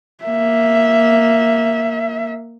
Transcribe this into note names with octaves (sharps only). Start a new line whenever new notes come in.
A#3 E5